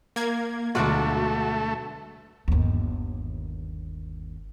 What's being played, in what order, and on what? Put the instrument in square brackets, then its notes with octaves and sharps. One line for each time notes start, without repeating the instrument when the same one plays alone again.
[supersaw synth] A#3 G#6
[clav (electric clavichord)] D2 B2 G#3 [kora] F#3 D4 F4 [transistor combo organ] A3 [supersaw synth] F#4
[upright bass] G1 D#2